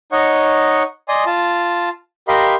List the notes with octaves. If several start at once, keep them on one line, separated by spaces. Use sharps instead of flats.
D#4 C#5 D#5 F#5 C#6
D5 D#5 G#5 C6 D#6
F4 A5
G4 A#4 D#5 F5 B5 C6